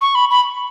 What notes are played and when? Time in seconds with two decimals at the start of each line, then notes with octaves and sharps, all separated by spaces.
0.01 C#6
0.15 B5
0.31 B5